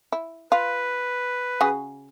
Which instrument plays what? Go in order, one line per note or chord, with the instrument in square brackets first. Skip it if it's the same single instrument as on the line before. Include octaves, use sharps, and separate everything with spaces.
[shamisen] E4
[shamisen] F4 [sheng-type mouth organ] B4
[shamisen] C#3 F#4 G#4